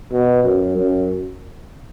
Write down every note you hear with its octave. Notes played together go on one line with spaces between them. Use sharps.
B2
F#2
F#2